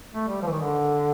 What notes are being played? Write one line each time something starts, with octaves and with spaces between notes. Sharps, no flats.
A3
G3
F3
E3
D#3
D3